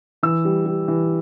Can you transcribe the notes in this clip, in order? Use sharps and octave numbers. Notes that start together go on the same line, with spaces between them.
E3 E6
G3
G3
E3